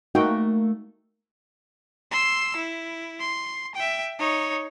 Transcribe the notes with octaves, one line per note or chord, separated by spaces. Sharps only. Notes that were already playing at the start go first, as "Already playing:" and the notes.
A3 A#3 D#4 F#4 G5
C6 E6
E4
C6
E5 G5
D#4 C#5